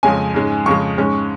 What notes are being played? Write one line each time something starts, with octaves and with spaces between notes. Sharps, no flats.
F2 C#3 G#3 C#4 G#5
G#2 G#3 C#4
F2 C#3 G#3 C#6
G#2 G#3 C#4